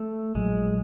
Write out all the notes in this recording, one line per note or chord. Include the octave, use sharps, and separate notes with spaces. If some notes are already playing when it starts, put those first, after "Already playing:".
Already playing: A3
A#1 A#2 F#3 G#3